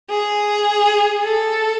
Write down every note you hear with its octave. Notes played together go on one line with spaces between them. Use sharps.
G#4
A4